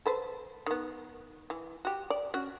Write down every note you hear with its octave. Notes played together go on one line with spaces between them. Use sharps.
A4 B4 C5
D#3 B3
E3
F#4 G4
D5
C#4 F#4